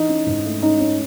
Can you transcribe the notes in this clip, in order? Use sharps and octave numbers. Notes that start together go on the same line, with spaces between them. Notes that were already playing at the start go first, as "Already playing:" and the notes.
Already playing: E3 D#4
C#4
G#2
A3
C#4 D#4
C#4